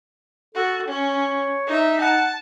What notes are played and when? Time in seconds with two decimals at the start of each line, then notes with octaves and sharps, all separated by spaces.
0.55 F#4 A4
0.88 C#4 C#5
1.67 D#4 E5
2.02 F#5 A5